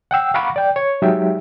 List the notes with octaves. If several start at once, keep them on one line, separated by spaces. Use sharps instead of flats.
F#5 G5 E6
F5 F#5 A#5 B5 C#6 D6
D5 G5
C#5
F#3 G#3 D#4 G4 E5